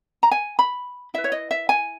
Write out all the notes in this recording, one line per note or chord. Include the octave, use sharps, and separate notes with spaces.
A#5
G#5
B5
E4 B4 E5
C#5
D#5
E5
G#5